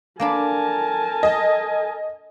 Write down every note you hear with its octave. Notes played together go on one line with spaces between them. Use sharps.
A#3 D4 A4 A#4 G#5 A5 B5
D#5